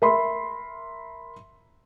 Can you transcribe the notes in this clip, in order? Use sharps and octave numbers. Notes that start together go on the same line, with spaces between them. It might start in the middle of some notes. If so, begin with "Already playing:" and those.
A#4 E5 B5 C6